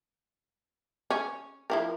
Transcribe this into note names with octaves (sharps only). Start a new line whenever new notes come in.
C#4
F3 E4 A#4